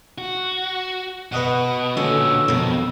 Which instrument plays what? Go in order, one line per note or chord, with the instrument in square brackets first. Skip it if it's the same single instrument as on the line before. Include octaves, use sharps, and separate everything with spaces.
[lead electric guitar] F#4
[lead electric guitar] B2 [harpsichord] B4 D#5 F#5
[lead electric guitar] A#2 C#4 [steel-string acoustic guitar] D3 F#4 [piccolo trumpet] E6
[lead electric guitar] F2 [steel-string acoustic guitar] B2 D#3